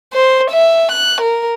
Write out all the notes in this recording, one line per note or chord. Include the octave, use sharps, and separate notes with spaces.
C5
E5
F#6
A#4